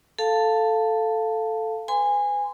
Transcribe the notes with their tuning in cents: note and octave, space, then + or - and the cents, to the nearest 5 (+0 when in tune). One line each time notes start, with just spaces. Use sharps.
A4 +0 F5 +0 A5 +10
B4 +40 G#5 -20 C6 -30